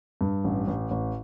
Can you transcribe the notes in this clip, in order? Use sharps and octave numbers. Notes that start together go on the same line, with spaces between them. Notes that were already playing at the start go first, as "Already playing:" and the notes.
G2
A1
A1
A1